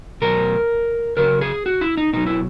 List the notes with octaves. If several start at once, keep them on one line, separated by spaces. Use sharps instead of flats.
B2 F#3 A#4
C#3 F#3 A#4
G#4
F#4
E4
D#4
B2 F#3 D#4
E4